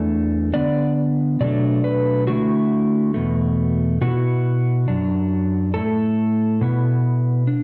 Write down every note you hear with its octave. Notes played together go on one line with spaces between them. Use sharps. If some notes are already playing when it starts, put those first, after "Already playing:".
Already playing: E2 E3 A3 D4 D5
D3 B3 D4 D5
B2 F#3 A3 D4 D5
B4
D3 A3 E4 F#4
E2 B2 A3
B2 B3 E4 F#4
F#2 F#3 D4
A2 A3 E4 A4
B2 B3 E4
D4